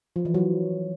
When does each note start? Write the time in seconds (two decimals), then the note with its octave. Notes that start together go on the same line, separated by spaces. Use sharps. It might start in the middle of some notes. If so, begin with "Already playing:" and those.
0.16 F3
0.25 E3
0.34 F#3